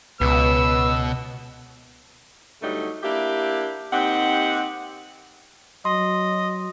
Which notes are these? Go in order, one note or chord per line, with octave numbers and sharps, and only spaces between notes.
C#2 B2 B4 E6
G2 D3 F#3 G3 A3 D#4
A#3 D4 E4 G4
D#2 C4 D#4 G4 F#5
F#3 D#5 C6